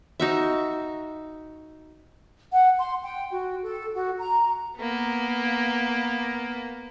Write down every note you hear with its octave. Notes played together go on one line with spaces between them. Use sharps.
D#4 F#4 E5
F#5
C6
G5
F#4
A4
F#4
A#5
A#3 B3